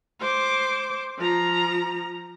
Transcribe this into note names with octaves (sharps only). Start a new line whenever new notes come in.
C5 D6
F3 A#5